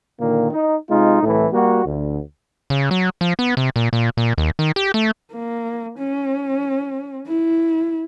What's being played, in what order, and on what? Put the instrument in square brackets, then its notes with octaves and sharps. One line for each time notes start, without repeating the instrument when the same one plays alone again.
[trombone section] A#2 D3 D#3 A#3
D#4
C3 G#3 D#4 F4
C2 A2 E3 A3
G3 A#3 F#4
D2
[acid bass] C#3
F#3
F3
B3
C3
A#2
A#2
A#2
D#2
D#3
G4
A3
[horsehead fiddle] A#3
C#4
E4